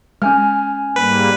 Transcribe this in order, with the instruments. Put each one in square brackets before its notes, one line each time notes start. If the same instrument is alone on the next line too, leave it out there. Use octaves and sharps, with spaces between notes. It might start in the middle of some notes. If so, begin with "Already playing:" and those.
[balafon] G#3 [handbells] C#4 G#5 F6
[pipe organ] G#2 G3 A#3 [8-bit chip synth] B4